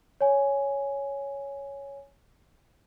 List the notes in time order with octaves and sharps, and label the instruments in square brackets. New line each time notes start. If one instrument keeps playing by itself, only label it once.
[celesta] C#5 G#5